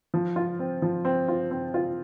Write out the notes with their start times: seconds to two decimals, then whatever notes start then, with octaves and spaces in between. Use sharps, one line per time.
0.14 F3
0.36 F4
0.59 C4
0.82 F3
1.05 C4
1.28 F4
1.51 C4
1.74 F4